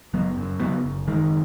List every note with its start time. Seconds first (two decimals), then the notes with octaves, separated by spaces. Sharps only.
0.13 F#1 F#3 B3
0.37 F#2
0.60 C#3 F#3 B3
0.84 F#1
1.07 F#1 D#3 G#3